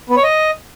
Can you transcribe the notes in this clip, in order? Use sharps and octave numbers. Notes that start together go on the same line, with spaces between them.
B3
C#5
D#5